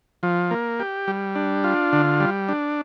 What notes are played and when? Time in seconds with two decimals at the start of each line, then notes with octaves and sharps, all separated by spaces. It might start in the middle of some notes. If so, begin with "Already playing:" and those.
0.23 F3
0.51 A#3
0.80 G4
1.08 G3
1.35 D4
1.64 F4
1.93 D3
2.20 G3
2.49 D4